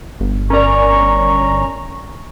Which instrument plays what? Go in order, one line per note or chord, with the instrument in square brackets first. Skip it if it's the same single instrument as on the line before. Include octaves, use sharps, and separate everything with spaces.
[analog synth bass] G1
[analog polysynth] C#4 A#5 [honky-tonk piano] A#4 D5 [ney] C#6